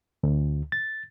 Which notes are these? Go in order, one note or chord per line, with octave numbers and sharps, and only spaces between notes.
D2
A6